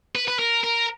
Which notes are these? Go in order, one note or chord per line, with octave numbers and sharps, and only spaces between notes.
B4
B4
A#4
A#4